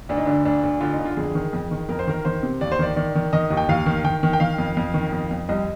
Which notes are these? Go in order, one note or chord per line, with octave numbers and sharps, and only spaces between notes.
D2 D4
D#4
D3 D4
D2 D4
D2
D3 F4
D#4
D3
F4
F2 G#4
D#3
F2
D#3
F2 A#4
C5
D#3 A#4
D#3 C5
C3
D#2 D5
C5
D#3 D5
D#3 D5
D#3
D#3 D#5
D#2
G5
D#2 F5
D#3
D#3 G5
D#3
G5
D#3 F5
F2
F2
D#3
F2
F2
C2 D#5